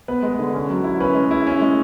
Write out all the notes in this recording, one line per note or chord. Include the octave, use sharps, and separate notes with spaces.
B3 B4
G#3
D3
C#4
F#3
E4
C#4 B4
G#3
E4
C#4
G#3